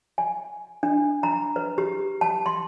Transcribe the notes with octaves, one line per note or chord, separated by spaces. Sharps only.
G#5
D4
A#5
B4
G4
A5
C6